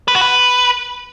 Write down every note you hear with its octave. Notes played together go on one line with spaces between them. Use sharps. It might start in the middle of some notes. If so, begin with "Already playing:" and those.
B4
F#4
B4